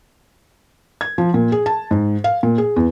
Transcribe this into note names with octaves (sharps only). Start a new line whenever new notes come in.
G#6
F3
A#2
G#4
A5
G#2
F5
A#2
G#4
E2